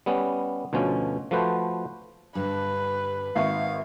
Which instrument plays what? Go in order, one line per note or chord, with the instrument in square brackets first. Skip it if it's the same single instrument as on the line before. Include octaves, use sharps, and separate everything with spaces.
[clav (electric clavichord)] G3 B3 C#4
D2 B2 F3 C#4
F3 A3 F#4 B4 C5
[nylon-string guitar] G2 D3 [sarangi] B4
[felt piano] G#1 E5 C#6 [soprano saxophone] F5